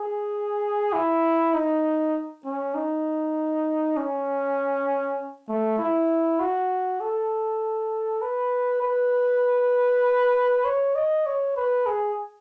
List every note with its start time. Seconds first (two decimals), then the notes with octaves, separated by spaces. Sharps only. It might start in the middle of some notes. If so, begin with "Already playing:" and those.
Already playing: G#4
0.93 E4
1.54 D#4
2.45 C#4
2.75 D#4
3.97 C#4
5.49 A3
5.79 E4
6.40 F#4
7.00 A4
8.22 B4
8.82 B4
10.65 C#5
10.95 D#5
11.26 C#5
11.56 B4
11.86 G#4